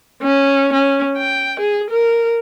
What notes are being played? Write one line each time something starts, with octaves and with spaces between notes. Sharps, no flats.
C#4
C#4
G5
G#4
A#4